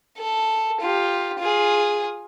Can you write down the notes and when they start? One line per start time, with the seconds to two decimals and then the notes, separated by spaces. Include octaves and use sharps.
0.18 A4
0.80 F4 G4
1.39 F4 G#4